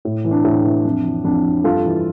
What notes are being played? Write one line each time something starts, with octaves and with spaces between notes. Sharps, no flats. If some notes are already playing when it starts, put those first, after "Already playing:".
A2
E3
D4
A2
E3
F2
E3
F2 D4
E3
G2 F4 A4
E3